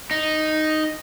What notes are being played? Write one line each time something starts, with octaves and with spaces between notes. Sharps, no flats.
D#4